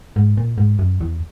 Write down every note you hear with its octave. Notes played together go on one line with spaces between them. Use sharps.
G#2
A#2
G#2
F#2
E2